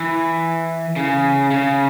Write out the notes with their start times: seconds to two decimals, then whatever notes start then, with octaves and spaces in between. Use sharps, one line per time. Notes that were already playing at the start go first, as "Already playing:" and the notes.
Already playing: E3
0.96 C#3
1.51 C#3